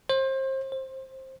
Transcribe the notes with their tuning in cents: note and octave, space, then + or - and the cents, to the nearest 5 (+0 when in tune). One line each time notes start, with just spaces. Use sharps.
C5 +30
C5 +15